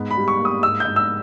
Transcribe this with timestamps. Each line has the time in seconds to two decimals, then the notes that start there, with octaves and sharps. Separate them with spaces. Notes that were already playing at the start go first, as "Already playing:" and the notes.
Already playing: G#2 B3
0.11 B5
0.17 G3
0.28 C#6
0.39 A#3
0.45 D#6
0.63 G#2 E6
0.80 G#2 G6
0.96 E6